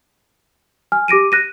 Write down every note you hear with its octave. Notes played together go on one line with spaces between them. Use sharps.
G#5 F6
G4 D6 A#6 D7 D#7
F#6 A#6 D#7